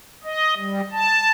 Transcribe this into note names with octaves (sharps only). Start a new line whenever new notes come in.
D#5
G3
A5